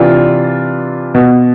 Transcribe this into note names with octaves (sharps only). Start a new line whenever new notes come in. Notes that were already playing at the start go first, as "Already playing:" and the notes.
Already playing: C3 E3 D4 F4
B2